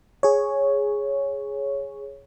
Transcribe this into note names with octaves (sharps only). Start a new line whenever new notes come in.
G#4 C#5